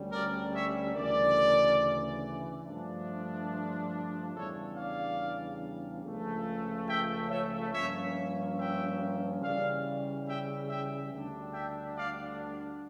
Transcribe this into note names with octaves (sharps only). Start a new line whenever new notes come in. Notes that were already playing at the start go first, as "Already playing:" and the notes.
Already playing: D2 D3 G3 C#4
A#4 D5
C#5 E5
D2 C#3 E3 A#4 D5
G2 F3 A3 D4
E2 C#3 G3 D4 A4 C#5
D5 F5
C#2 C#3 F3 A3
E5 G5
C#5 E5
G2 F3 A#3 C#4 C#5 E5
E5 G5
C#3 E3 G3 C#4 D5 F5
E5 G5
E5 G5
D2 D3 G3 D4
E5 G5
D5 F5